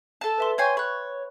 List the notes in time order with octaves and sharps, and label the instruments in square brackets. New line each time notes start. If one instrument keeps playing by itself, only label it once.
[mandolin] A4 A5
[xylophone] B4 E5 C6
[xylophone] C#5 C#6 [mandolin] G5 G#5 C6
[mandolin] C#5 [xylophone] B5 F#6